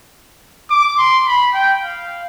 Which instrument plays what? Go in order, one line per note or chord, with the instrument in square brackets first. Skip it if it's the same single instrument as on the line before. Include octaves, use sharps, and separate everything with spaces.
[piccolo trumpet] D6
C6
B5
G5
F5